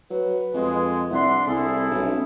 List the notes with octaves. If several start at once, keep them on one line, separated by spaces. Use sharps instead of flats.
F#3 B4
F2 G#3
C2 D4 E5 F#5 C6
C2 E4 G#4 A4
B1 C#4